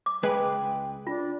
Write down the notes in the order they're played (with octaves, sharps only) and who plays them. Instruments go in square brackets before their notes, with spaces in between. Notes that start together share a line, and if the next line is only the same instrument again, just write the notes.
[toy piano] D6
[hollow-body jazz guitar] C#2 G#3 G#4 [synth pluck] B4 [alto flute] G5
[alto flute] D4 [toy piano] F4